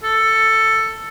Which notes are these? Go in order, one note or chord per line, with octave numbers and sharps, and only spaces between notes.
A4